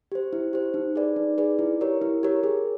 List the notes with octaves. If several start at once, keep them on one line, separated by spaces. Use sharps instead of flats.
G4 C5
E4
G4 C5
D#4
G#4 B4 D5
D#4
G#4 B4 D5
E4
G4 A#4 C#5
E4
G4 A#4 C#5
G#4